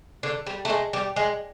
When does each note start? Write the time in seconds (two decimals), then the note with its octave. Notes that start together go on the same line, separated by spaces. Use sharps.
0.23 D3
0.47 G3
0.65 A3
0.70 G#3
0.93 G3
1.16 G#3